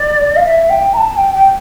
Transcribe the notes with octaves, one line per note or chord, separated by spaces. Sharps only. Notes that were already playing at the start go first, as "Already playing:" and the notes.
Already playing: D5
F5
E5
G5
A#5
A5
G5
G5